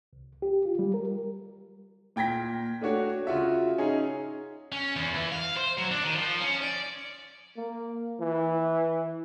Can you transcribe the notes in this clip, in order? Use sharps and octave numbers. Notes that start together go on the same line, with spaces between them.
C2
G4
F4
G3
A#4
A#2 G5 G#6 A#6 B6
A3 D4 F#4 C#5
C#3 F4 F#4 E5
C#4 D#4 G#4
C#4
E2
E3
F5
C5
F#3
D4
D#3
F3
C#4
D5
A#3
E3